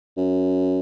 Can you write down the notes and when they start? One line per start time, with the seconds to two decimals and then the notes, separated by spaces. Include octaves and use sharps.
0.17 F#2